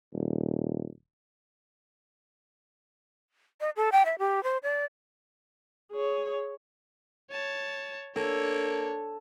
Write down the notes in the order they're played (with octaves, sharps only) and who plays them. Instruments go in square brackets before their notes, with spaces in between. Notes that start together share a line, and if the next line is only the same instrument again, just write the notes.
[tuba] D#1
[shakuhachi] D#5
A4
G5
E5
G4
C5
D5
[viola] G#4 C#5
[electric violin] C#5 A5
[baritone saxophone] A#3 [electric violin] D4 C#5 [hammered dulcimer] A4